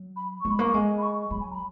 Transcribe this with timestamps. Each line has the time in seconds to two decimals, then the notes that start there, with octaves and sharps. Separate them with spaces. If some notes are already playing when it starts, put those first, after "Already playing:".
Already playing: F#3
0.16 B5
0.40 G#3 C#6
0.51 B5
0.59 A#3 C#6
0.74 G#3
0.98 B5
1.02 C#6
1.31 F#3 B5
1.40 G#5
1.51 A#5
1.55 B5